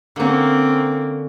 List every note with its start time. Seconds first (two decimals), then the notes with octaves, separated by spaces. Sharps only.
0.16 D3 A#3 C4 C#4